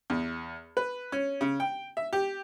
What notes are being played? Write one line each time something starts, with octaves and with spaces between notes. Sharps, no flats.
E2
B4
C#4
C#3
G5
E5
G4